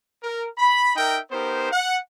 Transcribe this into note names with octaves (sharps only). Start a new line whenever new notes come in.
A#4
B5
D#4 A#4 E5 G5
B3 D#4 G4 A#4 C5
F#5